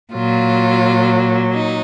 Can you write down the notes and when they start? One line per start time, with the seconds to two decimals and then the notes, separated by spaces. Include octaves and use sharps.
0.13 A#2 F#3 F4
1.53 D#4